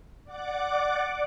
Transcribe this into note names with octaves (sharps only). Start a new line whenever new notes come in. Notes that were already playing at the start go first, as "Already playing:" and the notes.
D5 F#5 D6